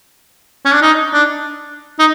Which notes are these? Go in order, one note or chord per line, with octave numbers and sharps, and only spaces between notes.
C#4
D4
D#4
D4
D#4